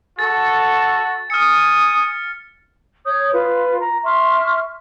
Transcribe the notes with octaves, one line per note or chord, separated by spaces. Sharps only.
F#4 A4 A6
G#5 D#6 F6 C#7
C#5 D#6 G6
F4 B4
A#5
E5 C6 C#6 F6